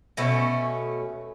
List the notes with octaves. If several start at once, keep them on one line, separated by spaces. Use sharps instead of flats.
B2 A3 C#4